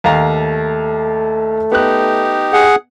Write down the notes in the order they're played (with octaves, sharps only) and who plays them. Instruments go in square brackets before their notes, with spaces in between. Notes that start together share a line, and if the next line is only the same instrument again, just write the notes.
[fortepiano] D#2 F5 A#5 [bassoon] A3
[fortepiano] B3 F#6 [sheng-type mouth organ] D#4 G4
[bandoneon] G#4 F#5